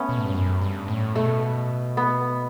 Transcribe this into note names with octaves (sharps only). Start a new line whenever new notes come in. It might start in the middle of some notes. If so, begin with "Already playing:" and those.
Already playing: A3 B3 C#4
B2
A2
G2
F#2
G2
A2
B2 A3
B3